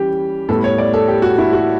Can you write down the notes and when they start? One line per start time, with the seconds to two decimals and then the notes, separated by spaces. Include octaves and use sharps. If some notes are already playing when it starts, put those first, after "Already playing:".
Already playing: E3 G3 C#4 G4
0.49 A2 G3 B3 A4
0.64 C#5
0.78 D5
0.94 A4
1.08 G4
1.22 F#4
1.38 E4
1.53 F#4